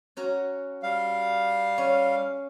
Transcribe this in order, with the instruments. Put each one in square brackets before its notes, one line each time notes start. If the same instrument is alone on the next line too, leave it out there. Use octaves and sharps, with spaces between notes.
[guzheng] C#4 F#4 A#5
[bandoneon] G3 F5
[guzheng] C#4